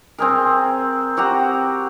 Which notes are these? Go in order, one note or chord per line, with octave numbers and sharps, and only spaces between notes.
C4 G#4 A#4
C4 F#4 G4 A#5